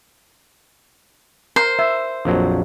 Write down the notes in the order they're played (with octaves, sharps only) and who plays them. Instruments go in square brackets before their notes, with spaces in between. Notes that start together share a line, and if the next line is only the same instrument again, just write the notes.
[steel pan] A#4 [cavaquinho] C5
[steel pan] E5
[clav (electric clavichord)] A#1 F2 F#3